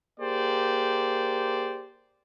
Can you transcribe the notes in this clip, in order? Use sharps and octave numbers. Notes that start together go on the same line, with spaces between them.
A#3 G4 G#4 C5 D5